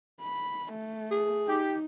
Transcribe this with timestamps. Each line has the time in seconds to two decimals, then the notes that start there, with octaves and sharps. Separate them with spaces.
0.22 B5
0.73 A3
1.11 G#4
1.47 D#4 G4